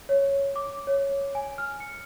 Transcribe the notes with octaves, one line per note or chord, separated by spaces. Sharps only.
C#5
D6
C#5
G#5
F6
C#7